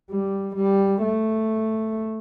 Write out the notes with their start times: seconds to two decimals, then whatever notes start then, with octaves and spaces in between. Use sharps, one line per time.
0.10 G3
0.56 G3
1.02 A3